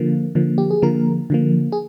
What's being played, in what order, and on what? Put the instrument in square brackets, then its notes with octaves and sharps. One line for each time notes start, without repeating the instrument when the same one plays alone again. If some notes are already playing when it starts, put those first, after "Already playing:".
Already playing: [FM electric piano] D3 F3 A#3
D3 F3 A#3
G4
G#4
D3 F3 A#3 A#4
D3 F3 A#3
G#4